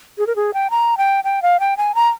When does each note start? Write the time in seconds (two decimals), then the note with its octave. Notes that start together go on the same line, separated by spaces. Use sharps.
0.18 G#4
0.27 A#4
0.36 G#4
0.54 G5
0.70 A#5
0.97 G5
1.24 G5
1.42 F5
1.60 G5
1.77 G#5
1.95 A#5